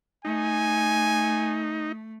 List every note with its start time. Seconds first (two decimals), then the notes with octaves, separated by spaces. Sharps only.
0.25 A3 D#4 G#5